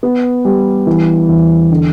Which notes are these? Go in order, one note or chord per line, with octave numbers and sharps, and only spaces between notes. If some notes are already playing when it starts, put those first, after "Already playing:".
B3
G3
E3
E2
D3